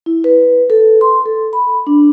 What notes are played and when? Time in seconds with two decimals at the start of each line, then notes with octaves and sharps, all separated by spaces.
0.06 E4
0.24 B4
0.70 A4
1.01 C6
1.26 A4
1.53 B5
1.87 D4